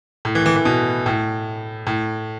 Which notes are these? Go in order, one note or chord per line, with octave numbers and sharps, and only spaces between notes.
A2
E3
E3
E3
B2
A2
A2